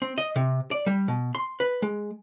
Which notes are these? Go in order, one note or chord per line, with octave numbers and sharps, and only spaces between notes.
C4
D#5
C3
D5
G3
B2
C6
B4
G#3